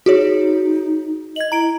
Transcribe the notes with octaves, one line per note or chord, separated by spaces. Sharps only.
D#4 F#4 G#4 C#5
D#5 G#6 F#7
E4 A#5 D7